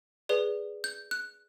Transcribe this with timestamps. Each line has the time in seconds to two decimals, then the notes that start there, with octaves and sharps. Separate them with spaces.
0.29 G#4 B4 D5
0.84 G6
1.11 F#6